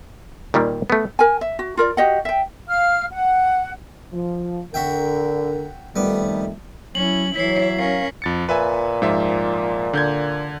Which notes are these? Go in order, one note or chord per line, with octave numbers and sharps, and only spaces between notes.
A#2 D#3 G3 A#3
A3 B3
A#4 G#5
E5
F#4
F4 A#4 D5
F#4 G4 D#5 F#5
E5 G5
F5 F6
F#5
F3
D3 F#4 A#4 E5 G5
F2 D#3 G3 A3 B3
F#3 C#4 E4 F#7
E3 F#3 E4 C#5 B6 C7
C#4 A#4 F5
F2 A6 C#7
A#2 B4 E5 G#5
G#2 F3 E5
D3 G6 G#6